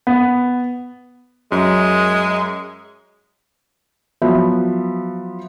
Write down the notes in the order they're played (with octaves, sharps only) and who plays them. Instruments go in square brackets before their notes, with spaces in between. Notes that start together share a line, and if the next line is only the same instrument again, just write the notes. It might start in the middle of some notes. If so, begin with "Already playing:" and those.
[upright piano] B3
[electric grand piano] F#2 [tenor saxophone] G#3
[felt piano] F3 F#3 B3 E5